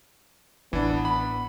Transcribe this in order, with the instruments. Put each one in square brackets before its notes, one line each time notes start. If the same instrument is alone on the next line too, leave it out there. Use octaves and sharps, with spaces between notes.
[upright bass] A1 [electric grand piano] E3 D4 [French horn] B3
[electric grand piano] B5